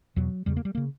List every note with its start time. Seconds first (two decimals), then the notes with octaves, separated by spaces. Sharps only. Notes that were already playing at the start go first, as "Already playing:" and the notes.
0.16 E2 B2 F#3
0.46 E2 C#3 G3
0.57 A#3
0.65 G3
0.75 C#3 A#3